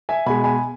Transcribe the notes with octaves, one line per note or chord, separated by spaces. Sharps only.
E5 G#5
B2 G#3 G#5 B5
G#5 B5